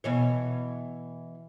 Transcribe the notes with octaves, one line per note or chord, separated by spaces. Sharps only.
B2 E3 C#5